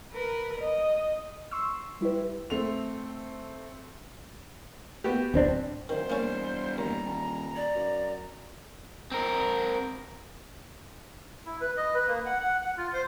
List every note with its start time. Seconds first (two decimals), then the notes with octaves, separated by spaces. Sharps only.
0.12 A#4 B4
0.61 D#5
1.51 C6 C#6 E6
2.01 G3 E4 G4 B4
2.50 A3 C4 F7
5.04 B3 F#4 G4
5.34 D1 C4 D4
5.89 D1 D#3 C5
6.10 E1 G3 A#3 C#4
6.78 D#2 A#5
7.05 D#1
7.56 D5
7.75 F#2
9.12 C4 A#4
11.46 E4
11.61 B4
11.77 D#5
11.95 B4
12.08 A#3
12.26 F#5
12.40 F#5
12.62 F#5
12.77 F4
12.93 C5